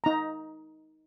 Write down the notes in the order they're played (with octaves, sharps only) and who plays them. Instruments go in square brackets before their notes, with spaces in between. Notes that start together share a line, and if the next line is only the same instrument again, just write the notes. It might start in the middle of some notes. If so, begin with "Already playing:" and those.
[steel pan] D#4 A#5